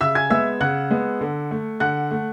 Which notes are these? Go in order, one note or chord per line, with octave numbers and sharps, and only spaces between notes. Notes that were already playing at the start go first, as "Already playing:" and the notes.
C#3 E5 E6
G#5 G#6
G#3 B3 E5 E6
C#3 F#5 F#6
G#3 B3
D3
A3
D3 F#5 F#6
A3